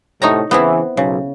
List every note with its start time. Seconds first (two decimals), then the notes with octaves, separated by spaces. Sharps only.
0.22 A2 C3 D#4 C#5 A#5
0.51 C#3 E3 B3 C4 E4
0.97 B1 C#3